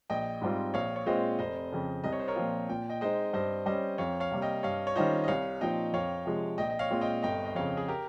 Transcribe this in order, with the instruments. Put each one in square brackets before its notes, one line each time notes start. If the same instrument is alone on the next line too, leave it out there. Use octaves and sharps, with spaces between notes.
[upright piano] A#1 [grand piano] D#5 G5
[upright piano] G#2 G3 C4 F4
[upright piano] A#1 [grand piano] C#5 F5
[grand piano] C#5
[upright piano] A#2 G#3 C4 F4 [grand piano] C5 D#5
[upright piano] F1 [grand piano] C5 D#5
[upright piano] F2 C#3
[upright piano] C2 [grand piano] D#5
[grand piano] C#5
C5
A#4 C#5
[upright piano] A#2 F3 C4 F4
[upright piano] A#2 [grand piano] G5
[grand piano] D#5 G5
[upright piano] G#3 D#4 [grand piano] C5 D#5
[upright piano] G2 [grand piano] C5 D#5
[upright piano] G3 C#4 [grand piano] C5 D#5
[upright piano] F2 [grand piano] C#5 F5
[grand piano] C#5 F5
[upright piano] C3 G3 A#3
[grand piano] D#5 G5
[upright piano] G2 [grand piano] C#5 F5
[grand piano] C#5
[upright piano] D#3 G3 C#4 F4 [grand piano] C5 D#5
[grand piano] D#5
[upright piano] C2 [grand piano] C#5 F5
[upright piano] A#2 F3 C4 D#4 [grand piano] D#5 G5
[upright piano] F2 [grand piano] C#5 F5
[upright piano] C3 F3 G#3
[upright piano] A#1 [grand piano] D#5 G5
[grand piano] D#5
C#5 F5
[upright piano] A#2 G#3 C4 F4
[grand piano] D#5 G5
[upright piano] G1 [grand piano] D#5 G5
[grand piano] D#5
[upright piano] F2 C#3 [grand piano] C#5 F5
[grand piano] G#4
G4 A#4